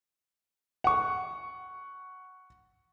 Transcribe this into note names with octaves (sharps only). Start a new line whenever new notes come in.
F#5 C#6